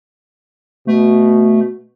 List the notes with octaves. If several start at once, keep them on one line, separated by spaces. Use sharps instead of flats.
B2 A3